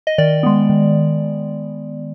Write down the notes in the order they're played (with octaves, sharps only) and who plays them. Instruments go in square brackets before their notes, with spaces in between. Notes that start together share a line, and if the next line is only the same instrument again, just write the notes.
[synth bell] D#5
D#3 D5
G#3 B3
D#3